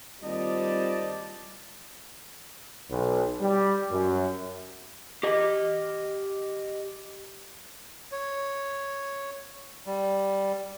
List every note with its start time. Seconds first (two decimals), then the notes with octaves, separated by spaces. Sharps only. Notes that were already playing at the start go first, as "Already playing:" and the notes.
0.23 G#1 D#2 G3 C4 F4 D5 D#5 A5
2.89 B1
3.41 G3
3.91 F#2
5.23 G4 D#5
8.12 C#5
9.86 G3